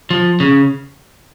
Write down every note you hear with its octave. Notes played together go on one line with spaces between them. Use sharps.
F3
C#3